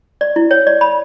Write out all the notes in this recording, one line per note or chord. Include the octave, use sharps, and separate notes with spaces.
D5
E4
C#5
D5
B5